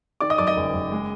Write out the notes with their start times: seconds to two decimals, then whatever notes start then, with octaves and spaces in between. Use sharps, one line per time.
0.20 D#3 D5 D6
0.30 D#5 D#6
0.38 F#2 D5 D6
0.47 D#5 D#6
0.57 F#1
0.74 F#1
0.92 G#3